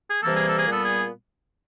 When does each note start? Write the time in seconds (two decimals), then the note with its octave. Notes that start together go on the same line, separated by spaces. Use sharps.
0.09 G#4
0.22 C3 E3 G3 A#3 A4
0.35 G#4
0.46 A4
0.59 G#4
0.68 A#2 G3 B3 A4
0.84 G#4